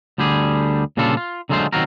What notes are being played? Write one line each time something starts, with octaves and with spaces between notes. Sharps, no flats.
D2 D3 G3 G4 G#4
A#2 C#3 G3 D4 F4 A4
F4
D3 F#3 G#3 A3 F4 C5
D#3 F#3 C4 F4 F#4 A#4